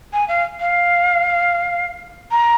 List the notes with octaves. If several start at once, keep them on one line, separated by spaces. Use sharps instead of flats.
G#5
F5
F5
A#5